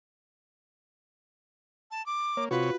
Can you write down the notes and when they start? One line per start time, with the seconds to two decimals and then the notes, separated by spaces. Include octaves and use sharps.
1.91 A5
2.06 D6
2.37 A#3 C#5
2.51 C3 F4 F#4 B4 C#5